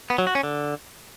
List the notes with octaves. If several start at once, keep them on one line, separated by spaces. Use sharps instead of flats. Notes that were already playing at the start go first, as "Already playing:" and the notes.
B3
F#3
F#4
C#4
D3